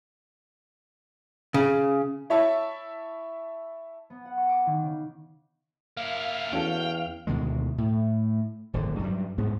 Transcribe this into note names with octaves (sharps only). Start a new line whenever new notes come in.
C#3
E4 C#5 E5 A5 C#6
B3
F#5
C#6
D6
D#3
C#3
A#3 E4 F5
E2 C#4 F#4 A4 G5
D2 B2 D#3 G#3
A2
D#1 G#1 F#2 D3
G2 F#3 G3
G#2 G#3 B3